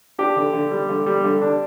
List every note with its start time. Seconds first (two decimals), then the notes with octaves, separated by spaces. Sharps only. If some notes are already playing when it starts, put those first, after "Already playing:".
0.19 D4 G4
0.36 D3
0.53 D3
0.71 G3
0.89 D3
1.06 G3
1.24 D3
1.42 D4